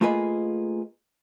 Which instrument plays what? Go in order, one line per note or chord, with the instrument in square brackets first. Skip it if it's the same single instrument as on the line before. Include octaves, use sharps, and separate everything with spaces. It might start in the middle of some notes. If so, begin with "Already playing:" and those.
[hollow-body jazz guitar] A3 A#3 F4 G#4 B4 D#5